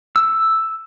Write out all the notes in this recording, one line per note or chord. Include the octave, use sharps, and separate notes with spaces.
E6